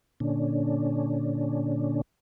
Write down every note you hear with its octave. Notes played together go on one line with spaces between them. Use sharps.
A#2 D3 C#4 D4